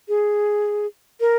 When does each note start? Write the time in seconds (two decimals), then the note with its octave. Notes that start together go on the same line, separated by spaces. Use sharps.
0.08 G#4
1.20 A#4